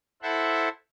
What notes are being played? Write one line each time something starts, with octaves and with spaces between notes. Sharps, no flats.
E4 A4 C5 E5 F#5